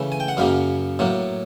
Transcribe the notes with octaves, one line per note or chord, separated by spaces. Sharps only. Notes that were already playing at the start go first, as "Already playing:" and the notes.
Already playing: C#3 E3 A3
G#5
G5
F#5
F#2 C#3 F#3 A#3 F5
A2 F#3 A#3